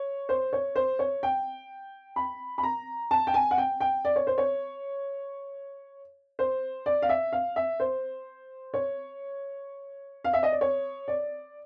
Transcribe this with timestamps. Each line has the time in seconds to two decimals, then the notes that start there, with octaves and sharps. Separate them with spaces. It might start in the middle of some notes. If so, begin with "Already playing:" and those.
Already playing: C#5
0.29 C5
0.53 C#5
0.76 C5
0.99 C#5
1.23 G5
2.16 B5
2.58 B5
2.63 A#5
3.11 A5
3.27 G5
3.34 G#5
3.51 F#5
3.58 G5
3.81 G5
4.05 D5
4.16 C#5
4.27 C5
4.38 C#5
6.39 C5
6.86 D5
7.02 F5
7.09 E5
7.33 F5
7.56 E5
7.80 C5
8.74 C#5
10.24 F5
10.33 E5
10.43 D#5
10.52 D5
10.61 C#5
11.08 D5